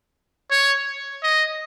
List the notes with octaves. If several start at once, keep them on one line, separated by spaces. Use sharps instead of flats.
C#5
D#5